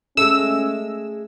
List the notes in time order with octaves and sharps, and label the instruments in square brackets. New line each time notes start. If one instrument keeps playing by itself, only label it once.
[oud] G#3 A3 [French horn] C#4 [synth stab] E6